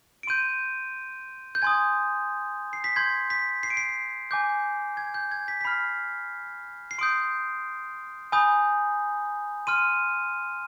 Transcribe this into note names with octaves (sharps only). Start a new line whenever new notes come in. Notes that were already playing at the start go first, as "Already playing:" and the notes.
D7
C6 G6 D#7
G6
G#5 C6 D#6 G#6
C7
B6
C6 G6 G#6
B6
C7
D7
C7
G#5 D6 G6
G#6
G6
G#6
B6
B6
B5 F6 C7
C7
C6 D#6 G6 D7
G#5 B5 D#6 G6
C6 F6 D#7